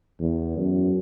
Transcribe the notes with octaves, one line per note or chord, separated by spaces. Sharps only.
E2
F#2